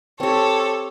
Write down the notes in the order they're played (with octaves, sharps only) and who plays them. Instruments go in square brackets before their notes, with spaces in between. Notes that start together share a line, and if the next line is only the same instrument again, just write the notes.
[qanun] C4 G4 [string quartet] A4 C#5